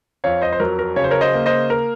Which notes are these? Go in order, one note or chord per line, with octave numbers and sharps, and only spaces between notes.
F2 C#5 F5
C5 D#5
C5
F#3 A#4
A#4
C#3 C#5
C5
A#4 C#5
C5 D#5
A#3
C5 D#5
A#4